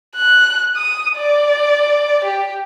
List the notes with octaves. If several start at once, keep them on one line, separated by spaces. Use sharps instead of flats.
F#6
D#6
D5
G4